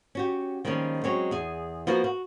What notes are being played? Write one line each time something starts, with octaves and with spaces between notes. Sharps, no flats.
C#4 F#4 G4
D#3 F3 G3 G#3 A#3 C#4
F#3 G#3 C4 C#4 C#5
E2 G#4
F3 A#3 B3 F4 F#4 A#4
F#4